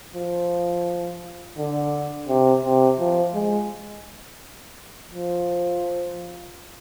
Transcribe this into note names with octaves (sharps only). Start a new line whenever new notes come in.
F3
D3
C3
C3
F3
G#3
F3